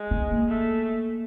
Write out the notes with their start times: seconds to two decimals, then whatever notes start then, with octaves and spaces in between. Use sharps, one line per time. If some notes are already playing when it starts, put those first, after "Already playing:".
Already playing: G#3
0.11 B3
0.31 A#3
0.49 A3